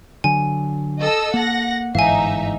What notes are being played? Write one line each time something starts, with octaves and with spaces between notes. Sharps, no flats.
D3 F#3 G#5
A4 D#5 E6
A#3 F#5 A#6
G1 G#2 E3 D#4 E5 F5 G#5